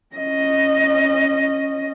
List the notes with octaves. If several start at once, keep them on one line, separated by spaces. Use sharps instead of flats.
C#4 D#5